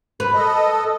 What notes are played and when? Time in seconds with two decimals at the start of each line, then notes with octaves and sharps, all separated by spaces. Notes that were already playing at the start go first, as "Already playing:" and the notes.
0.20 B4
0.34 A4 D#5